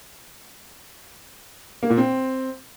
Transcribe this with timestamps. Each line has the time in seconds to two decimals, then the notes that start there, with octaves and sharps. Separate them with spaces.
1.83 A#3
1.90 A#2
1.97 C4